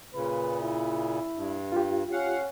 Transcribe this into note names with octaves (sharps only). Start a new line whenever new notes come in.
A#2 C#3 B4
E4
G2
F4 G4
C#4 F5 F#5